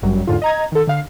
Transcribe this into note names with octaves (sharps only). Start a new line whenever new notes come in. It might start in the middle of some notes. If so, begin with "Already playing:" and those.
G1 F#2 F#3 G3
E2 G#2 D3 F4
D#5 A#5 G#6
D#3 A4
D3 F5